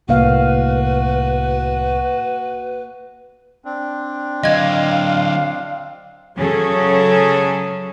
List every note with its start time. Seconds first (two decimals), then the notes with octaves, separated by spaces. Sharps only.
0.09 C2 A2 A#3 F#4 B4 F5
3.65 C4 D4
4.44 D3 F#3 D#5 F5 G#6
6.36 C#3 F#3 C#4 G#4 A4